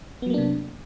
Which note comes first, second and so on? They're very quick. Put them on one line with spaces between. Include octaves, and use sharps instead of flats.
B3 F#3 A#3 D4 C3